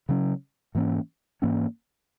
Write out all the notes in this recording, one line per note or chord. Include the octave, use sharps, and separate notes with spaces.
C#3 F#3 C#4
G#2 E3 A#3 C#4
G#2 E3 A#3 C#4